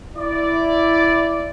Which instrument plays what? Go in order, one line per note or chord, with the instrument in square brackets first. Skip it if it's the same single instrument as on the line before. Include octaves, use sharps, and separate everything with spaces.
[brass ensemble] E4 D5